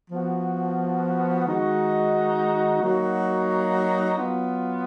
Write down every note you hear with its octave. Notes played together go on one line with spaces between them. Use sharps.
F3 B3 F#4
D#3 G#3 D#4 F#4
F#3 A#3 D#4 F#4
F#3 B3 F4